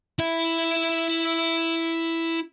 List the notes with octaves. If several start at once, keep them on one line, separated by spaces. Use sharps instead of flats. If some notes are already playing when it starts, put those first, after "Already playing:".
E4 E5